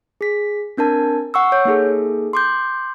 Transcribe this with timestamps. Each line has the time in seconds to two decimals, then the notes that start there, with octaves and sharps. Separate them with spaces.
0.21 G#4 B6
0.77 C4 D4 A#4 A5 G#6
1.34 F#5 C#6 E6
1.52 C#5 G6
1.65 A#3 D#4 G#4 A4
2.33 C6 D6 G6